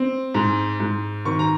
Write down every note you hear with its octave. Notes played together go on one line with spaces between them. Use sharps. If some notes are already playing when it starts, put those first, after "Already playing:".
Already playing: C4
G#2
G#2
D#3 C#6
A#5